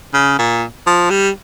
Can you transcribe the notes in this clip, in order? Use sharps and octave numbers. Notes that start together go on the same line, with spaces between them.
C#3
A#2
F3
G3